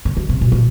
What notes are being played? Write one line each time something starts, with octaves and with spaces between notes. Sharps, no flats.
D3
D3
C3
A#2
A#2